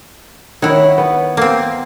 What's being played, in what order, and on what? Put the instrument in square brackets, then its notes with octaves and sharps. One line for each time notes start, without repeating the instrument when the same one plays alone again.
[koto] D#3 E4 [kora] C#5 F#5
[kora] B3
[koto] A#3 C4